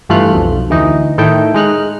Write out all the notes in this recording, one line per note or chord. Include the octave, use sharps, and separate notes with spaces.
G2 E3 A3 F4 F6 F#6
B1 F2
D2 E3 D#4
A2 D#3 D#4 E4 A4 G5
G#3 D#4 F6 F#6